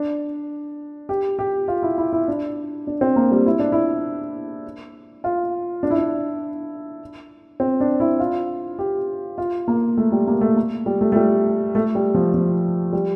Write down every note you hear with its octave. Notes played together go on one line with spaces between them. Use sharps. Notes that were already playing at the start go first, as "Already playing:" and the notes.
Already playing: D4
G4
G4
F4
E4
E4
E4
D4
D4
C4
A#3
G3
E4
D4
E4
F4
D4
E4
D4
C4
D4
E4
F4
G4
F4
A#3
A3
G3
A#3
A3
A#3
G3
A3
A3
G3
A3
G3
F3
F3
G3